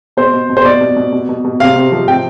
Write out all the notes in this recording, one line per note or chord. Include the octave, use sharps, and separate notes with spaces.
B2 C5
B2
B2
C5
B2 D5
B2
B2
B2
B2
B2
C3 F5
C3
F3
C3 G5